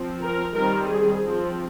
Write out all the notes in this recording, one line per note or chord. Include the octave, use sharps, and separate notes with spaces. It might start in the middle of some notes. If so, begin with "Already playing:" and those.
Already playing: F3 C4
A#4
D#3 G3 C4 A#4
G#4
F3 C4